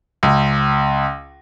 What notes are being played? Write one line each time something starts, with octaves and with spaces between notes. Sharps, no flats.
C#2